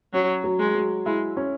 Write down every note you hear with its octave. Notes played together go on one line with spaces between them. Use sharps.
F#3 C#4
F#3
G#3
F#3
G#3 E4
C#4